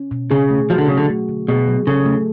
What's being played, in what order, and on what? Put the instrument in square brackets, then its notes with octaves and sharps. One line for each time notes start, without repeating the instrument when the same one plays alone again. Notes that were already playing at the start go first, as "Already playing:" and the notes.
Already playing: [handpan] C#4
B2
[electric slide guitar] C#3 [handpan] G#4
[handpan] A3
[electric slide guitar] F3 [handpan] F#4
[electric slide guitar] D3
[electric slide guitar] C#3 [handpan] F#3
[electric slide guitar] D3
[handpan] A3
D3
[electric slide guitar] B2 [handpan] G#4
[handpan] F#3
[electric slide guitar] C#3 [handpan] A4
[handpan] A3